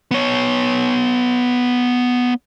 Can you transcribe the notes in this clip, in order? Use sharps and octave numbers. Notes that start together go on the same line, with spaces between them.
B3 C#5